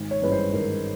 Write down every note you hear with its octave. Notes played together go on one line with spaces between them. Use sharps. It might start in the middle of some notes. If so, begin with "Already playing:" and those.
Already playing: G#1
C#5
G2 E3 G#3 C#4 B4
C5
G#1 A#4